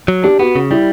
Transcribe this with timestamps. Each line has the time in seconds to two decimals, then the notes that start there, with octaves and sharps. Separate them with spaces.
0.08 F#3
0.24 D4 G4
0.39 B3 F#4
0.56 C#3
0.71 G3 E4